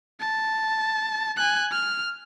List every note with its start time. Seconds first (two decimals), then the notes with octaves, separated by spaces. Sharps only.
0.20 A5
1.37 G#5 F#6
1.71 F6